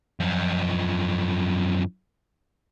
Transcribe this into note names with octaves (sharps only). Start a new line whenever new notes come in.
F#2 F3